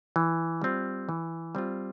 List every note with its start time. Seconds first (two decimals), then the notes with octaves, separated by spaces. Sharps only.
0.16 E3
0.62 G3 C4 F4
1.09 E3
1.55 G3 C4 F4